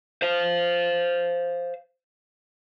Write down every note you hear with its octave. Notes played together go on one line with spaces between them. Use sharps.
C5 F5